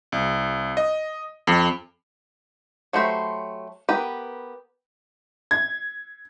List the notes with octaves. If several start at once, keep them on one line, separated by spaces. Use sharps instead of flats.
C2
D#5
F2
F#3 A3 G4 C5 B5
B3 G4 A#4 B4
G#6